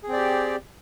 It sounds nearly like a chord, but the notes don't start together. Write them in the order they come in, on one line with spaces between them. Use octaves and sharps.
G#4 C4 D5 G4